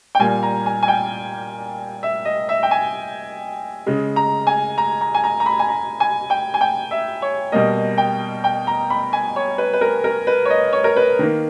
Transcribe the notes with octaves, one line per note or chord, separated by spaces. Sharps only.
G5
A#2 G3 A#3 G#5
A#5
G#5
G#5
G5
E5
D#5
E5
G5
G#5
C#3 G#3
A#5
G#5
A#5
A#5
G#5
A#5
A#5
B5
G#5
A#5
G#5
G5
G#5
G5
E5
C#5
B2 G3 A#3 D#5
G5
G5
A#5
B5
G#5
C#5
B4
B4
A#4
A#4
B4
C#5
D#5
C#5
A#4
B4
D#3 A#3